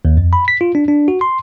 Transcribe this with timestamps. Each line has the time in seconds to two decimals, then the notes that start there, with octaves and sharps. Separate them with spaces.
0.05 D#2
0.17 F2
0.33 B5
0.48 B6
0.61 F4
0.75 D4
0.88 D4
1.08 F#4
1.21 C6